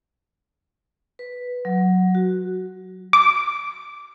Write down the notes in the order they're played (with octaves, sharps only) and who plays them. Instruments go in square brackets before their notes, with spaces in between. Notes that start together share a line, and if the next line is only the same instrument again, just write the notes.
[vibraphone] B4
F#3
F#4
[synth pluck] D6